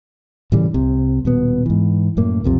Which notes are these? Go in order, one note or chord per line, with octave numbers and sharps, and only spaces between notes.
A2 C#3 E3 G3
C2 C3
D#1 B2 B3
G#2 E3
F#2 A2 A#3
B1 F2 C3